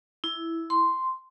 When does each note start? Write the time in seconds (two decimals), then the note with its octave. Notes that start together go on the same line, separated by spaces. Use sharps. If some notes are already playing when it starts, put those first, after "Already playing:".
0.24 E4
0.70 C6